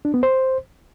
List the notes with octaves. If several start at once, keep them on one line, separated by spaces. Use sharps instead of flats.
D4
B3
C5